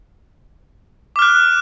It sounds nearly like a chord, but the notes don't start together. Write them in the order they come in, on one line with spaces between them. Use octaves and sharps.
D6 F6 F#6